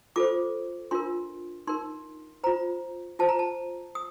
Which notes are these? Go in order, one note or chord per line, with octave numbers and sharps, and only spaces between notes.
F4 A4 C5 D6
D4 F4 A#4 C6
D#4 A#4 C6
F4 C5 A#5
F4 C5 A5
A#5
A5
D#6